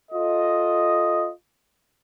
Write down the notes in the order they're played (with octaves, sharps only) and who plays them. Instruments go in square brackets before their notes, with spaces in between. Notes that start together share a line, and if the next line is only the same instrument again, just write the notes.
[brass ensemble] F4 A4 D#5